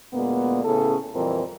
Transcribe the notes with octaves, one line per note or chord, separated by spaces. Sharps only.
D2 A#2 G#3 A#3 B3
A2 C#3 B3 C#4 G#4 A4
F2 A#2 E3 G3 C4 A#4